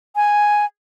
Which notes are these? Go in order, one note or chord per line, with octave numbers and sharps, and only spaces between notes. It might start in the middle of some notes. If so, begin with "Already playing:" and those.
G#5